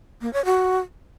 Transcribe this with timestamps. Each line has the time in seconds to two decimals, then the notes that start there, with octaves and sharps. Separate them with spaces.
0.21 A#3
0.33 C#5
0.45 F#4